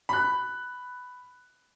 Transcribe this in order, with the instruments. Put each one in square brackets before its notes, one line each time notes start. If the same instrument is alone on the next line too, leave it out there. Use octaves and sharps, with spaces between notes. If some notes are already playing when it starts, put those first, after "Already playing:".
[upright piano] B5 F#6